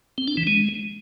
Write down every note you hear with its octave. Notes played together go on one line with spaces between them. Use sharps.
C4
D4
E3
G#3